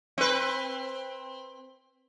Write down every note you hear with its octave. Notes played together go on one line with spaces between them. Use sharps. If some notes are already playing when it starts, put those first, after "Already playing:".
C4 B4